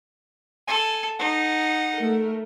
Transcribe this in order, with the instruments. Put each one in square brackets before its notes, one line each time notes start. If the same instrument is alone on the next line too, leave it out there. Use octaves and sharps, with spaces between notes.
[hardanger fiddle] A4 [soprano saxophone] G#5
[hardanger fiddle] D#4 [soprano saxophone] F#5
[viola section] A3 A#4